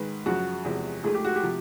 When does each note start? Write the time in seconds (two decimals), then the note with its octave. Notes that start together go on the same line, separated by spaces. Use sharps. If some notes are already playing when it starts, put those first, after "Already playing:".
Already playing: G#2 D#3 G#3 B4
0.26 F#2 C#3 F3 F#4
0.65 E2 C3 F3 G#3
1.04 G#2 F3 A3 G#4
1.15 G4
1.25 F#4
1.36 G4
1.43 C3 F3